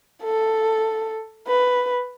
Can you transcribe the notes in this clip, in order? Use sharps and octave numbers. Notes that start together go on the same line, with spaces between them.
A4
B4